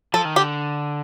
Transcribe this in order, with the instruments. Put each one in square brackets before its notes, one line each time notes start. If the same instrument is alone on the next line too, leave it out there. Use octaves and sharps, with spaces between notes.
[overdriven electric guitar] F3 [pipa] A4
[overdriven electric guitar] D#3
[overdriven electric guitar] D3 [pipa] G4